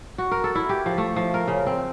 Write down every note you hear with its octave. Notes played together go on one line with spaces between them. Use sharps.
F#4
A#4
A4
E4
G4
F3
A3
F3
A#4
C#3
C4